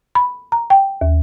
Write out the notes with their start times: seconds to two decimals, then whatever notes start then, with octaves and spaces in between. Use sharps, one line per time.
0.15 B5
0.52 A#5
0.70 G5
1.01 D#2